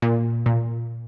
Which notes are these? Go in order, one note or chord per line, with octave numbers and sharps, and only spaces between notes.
A#2
A#2